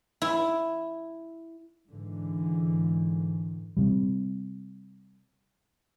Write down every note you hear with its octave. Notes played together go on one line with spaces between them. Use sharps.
E4
G#2 D3 E3
C3 G3